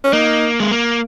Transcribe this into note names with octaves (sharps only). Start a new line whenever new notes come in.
C#4
A#3 D#4
G#3
A#3